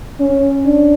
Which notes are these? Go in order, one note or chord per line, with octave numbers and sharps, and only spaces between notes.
C#4
D4